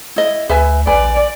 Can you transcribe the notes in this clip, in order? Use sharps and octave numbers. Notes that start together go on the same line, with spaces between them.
E4 D#5
D2 B4 E5 G#5
A#1 B4 D5 G#5